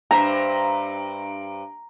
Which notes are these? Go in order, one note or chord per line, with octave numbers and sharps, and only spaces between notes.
G2 C5 E5 A#5